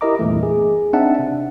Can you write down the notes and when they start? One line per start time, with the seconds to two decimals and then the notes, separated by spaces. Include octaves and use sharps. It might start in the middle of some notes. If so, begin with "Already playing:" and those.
0.01 E4 G4 A#4 D#5 A#5 D6
0.19 E2 G2 A#2 E3 A3
0.43 G#4
0.93 C4 D4 D#4 E5 F#5 A5
1.19 C3